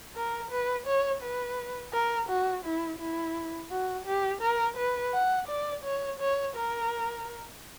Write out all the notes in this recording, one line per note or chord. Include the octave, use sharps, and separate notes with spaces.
A#4
B4
C#5
B4
A#4
F#4
E4
E4
F#4
G4
A#4
B4
F#5
D5
C#5
C#5
A#4